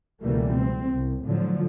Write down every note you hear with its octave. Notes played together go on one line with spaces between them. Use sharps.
C#2 B2 E3 G3 A3 A#3
C4
C2
A2 D3 F3 F#3